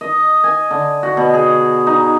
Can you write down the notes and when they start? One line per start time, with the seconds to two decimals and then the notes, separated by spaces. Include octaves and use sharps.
0.01 D#5
0.44 G#5
0.71 D3
1.03 F#4
1.17 B2
1.34 G#4
1.87 D#4